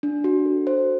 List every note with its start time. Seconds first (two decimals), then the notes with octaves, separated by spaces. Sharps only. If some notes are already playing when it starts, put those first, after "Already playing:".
0.03 D4
0.24 F#4
0.46 A4
0.67 C5